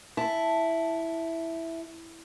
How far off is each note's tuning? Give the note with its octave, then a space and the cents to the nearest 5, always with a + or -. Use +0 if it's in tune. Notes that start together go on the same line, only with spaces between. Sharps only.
E4 +0 A5 +0